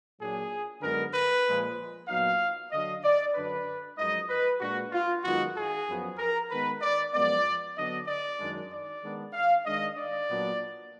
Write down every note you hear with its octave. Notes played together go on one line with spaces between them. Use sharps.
A#2 F#3 D4 G#4
F#2 D3 G#3 B3 A#4
B4
A#2 F3 G#3
A#2 F#3 B3 D#4 F5
D3 F#3 D4 D#5
D5
F#2 D3 F#3 D4 B4
F#2 F3 G#3 D#4 D#5
B4
A#2 G#3 D4 F#4
F4
F#2 D#3 G#3 B3 D#4 F#4
G#4
F#2 F3 B3
A#4
D#3 G#3 B3 B4
D5
F#2 F3 G#3 B3 D5
D3 F#3 B3 D4 D#5
D5
F#2 D#3 G#3 D4
D5
D#3 G#3 B3 D4
F5
D#3 G#3 D4 D#5
D5
A#2 F#3 B3 D4